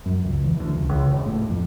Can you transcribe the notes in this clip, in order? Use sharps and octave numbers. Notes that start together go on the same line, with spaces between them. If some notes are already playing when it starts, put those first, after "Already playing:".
F#2
C#2
E2
D2
C#2
C#2
E1
A2
F2